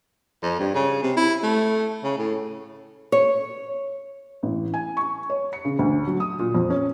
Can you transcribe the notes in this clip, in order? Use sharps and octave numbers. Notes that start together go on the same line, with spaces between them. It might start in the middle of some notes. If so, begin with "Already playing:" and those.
F2
G2
C#3
C3
E4
A3
C#3
A2
C#5
A1
G#5
C#6
C#5
C#7
C#3
D2
F#3
D#6
A#2
F2
C#4